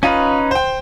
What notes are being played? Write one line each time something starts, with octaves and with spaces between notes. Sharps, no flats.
C#4 D#4 F4 B4 D#7
C5 G5